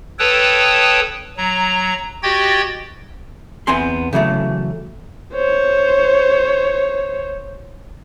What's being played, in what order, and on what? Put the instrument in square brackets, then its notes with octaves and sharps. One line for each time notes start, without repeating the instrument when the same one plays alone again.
[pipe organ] A4 B4 C#5 G5 A5 D#6
F#3 A#5
F#4 G4 D#5 G5 G#6 A6
[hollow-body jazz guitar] E2 B3 C4 G#5 C6
C#3 E3 F#3 A3
[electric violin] C5 C#5